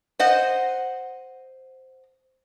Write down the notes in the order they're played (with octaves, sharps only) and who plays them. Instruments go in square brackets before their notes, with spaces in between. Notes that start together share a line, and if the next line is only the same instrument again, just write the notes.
[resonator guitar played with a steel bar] C5 D#5 F#5